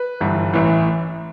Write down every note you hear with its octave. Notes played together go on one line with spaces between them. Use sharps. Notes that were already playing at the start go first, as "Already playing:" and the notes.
Already playing: B4
G1 G2 E3
A1 A2 E3